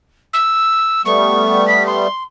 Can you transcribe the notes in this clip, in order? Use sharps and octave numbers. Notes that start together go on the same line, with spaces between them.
E6
G3 A3 B3 C#6
B6
C6